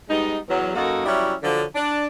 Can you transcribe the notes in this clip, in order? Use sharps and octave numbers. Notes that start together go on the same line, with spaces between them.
G3 G#3 B3 D#4
E2 F#3
F#2 A#3 D#4 F#4 A4 F5
F#3 G3 C#4 E4
D3 F3 F#3
D4